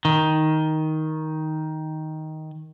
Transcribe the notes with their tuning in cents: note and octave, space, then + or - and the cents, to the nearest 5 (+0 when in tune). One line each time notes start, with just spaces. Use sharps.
D#3 +10